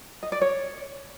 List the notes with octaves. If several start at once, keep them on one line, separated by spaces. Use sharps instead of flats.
D#5
D5
C#5